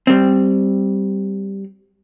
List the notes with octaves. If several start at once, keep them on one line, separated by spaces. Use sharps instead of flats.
G3 C4